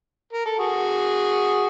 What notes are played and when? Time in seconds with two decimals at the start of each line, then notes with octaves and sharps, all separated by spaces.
0.33 A#4
0.45 A4
0.59 F#4 G#4